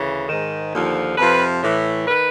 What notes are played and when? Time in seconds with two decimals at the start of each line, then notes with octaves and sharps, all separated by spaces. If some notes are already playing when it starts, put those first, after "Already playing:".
Already playing: D2 C#3 E3
0.28 G#2 D#3
0.73 D#2 D3 F3
1.17 F2 C3 F3 B4
1.63 A2 E3
2.07 D#3 B4